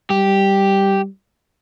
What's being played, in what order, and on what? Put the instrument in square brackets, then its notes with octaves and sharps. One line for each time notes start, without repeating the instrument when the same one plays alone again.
[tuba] G3 [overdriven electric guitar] G4